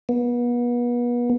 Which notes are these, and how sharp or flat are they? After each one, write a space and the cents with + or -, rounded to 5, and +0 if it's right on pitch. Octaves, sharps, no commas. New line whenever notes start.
B3 -35